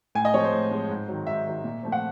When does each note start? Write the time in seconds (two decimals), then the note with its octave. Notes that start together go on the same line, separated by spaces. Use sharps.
0.15 A2 G#5
0.25 D#5
0.34 F3 G#3 C4 C#5
0.44 C5
0.53 A2
0.71 F3 G#3 C4
0.89 G#2
1.08 D#3 F#3
1.27 G#2 E5
1.46 D#3 F#3
1.64 A#2
1.83 F3 A3 C4
1.92 F#5